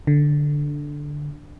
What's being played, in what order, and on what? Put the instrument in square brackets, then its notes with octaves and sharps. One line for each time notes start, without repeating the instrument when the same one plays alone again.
[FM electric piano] D3